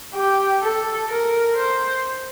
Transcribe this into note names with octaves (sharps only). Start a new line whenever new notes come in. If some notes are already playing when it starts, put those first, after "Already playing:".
G4
A4
A#4
C5